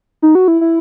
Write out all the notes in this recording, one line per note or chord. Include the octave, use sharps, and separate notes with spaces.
D#4
F#4
E4
E4